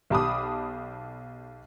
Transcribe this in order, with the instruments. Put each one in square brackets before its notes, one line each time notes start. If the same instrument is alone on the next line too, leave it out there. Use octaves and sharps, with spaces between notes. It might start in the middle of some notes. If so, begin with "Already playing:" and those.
[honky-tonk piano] B1 G4 A5 B5 D6 D#6